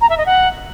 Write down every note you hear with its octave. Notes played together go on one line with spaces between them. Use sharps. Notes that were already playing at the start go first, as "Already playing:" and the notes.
A#5
E5
D#5
F#5